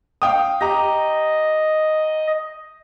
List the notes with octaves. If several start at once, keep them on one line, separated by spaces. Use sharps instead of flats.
F5 G5 D#6
G4 D#5 A#5